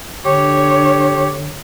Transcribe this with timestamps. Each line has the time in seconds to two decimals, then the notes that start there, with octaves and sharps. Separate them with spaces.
0.25 D3 G4 C#5